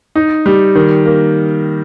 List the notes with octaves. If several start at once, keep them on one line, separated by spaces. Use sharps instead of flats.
D#4
G3
D#3
A#3